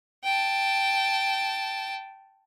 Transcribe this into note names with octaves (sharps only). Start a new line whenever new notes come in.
G5 A5